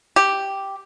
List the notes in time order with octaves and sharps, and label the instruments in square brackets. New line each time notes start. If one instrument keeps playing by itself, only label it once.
[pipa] G4